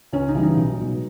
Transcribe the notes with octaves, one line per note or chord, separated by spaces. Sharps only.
C#2 C#4
D#4
C#3 E3 G3
D#4
B1
B2 G#3